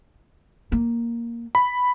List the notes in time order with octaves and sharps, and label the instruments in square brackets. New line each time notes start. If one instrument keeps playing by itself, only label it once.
[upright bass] A#3
[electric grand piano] B5